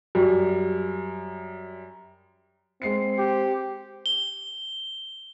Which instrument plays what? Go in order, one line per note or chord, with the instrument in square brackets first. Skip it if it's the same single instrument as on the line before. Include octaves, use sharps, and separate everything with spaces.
[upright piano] F#2 G3
[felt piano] G#3 C7 C#7 [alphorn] C4
[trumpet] G4
[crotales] G7